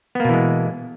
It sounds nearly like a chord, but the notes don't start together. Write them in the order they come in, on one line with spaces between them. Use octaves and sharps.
B3 A#3 B2 E3 G#3